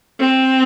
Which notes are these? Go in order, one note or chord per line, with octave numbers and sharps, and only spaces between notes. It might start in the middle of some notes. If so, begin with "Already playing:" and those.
C4